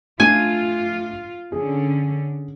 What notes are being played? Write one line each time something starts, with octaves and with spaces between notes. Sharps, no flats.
A3 D4 F4 G#5
D3 C#4 G#4